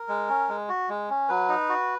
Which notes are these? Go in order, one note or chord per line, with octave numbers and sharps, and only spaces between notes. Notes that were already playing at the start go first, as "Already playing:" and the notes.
Already playing: A#4
G#3
C#4
G#3
F#4
G#3
C#4
F#3 B4
D#4
F#4